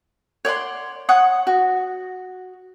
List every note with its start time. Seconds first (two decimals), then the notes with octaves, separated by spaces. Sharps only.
0.45 C#5 D5 F#5 C6
1.09 C#5 F#5 D#6
1.47 F#4